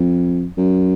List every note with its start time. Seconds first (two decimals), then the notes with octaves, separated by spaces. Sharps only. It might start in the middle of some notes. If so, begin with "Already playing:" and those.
Already playing: F2
0.58 F#2